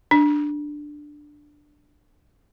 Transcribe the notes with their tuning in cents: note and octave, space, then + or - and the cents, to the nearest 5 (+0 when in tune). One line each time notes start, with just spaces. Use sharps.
D4 +10